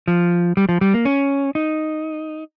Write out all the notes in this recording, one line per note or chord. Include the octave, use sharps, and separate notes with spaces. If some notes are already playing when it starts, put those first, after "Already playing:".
F3
G3
F3
G3
A#3
C#4
D#4